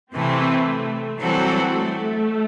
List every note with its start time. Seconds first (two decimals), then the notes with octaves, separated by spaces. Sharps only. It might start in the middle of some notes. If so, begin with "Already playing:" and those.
0.13 C3 E3 A3 C4
0.67 A3
1.20 E3 F#3 G3 C4 F#4 A4
1.73 A3